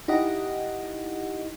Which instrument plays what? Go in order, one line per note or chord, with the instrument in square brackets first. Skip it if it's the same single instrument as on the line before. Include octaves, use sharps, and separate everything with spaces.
[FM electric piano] D#4 E4 G4 D#5 F#5